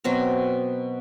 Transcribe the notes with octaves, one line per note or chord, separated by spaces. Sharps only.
B2 F#3 C4 A#5